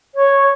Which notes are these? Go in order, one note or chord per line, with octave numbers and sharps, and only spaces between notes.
C#5